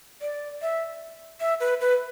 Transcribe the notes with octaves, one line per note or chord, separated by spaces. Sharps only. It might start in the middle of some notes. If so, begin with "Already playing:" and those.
D5
E5
E5
B4
B4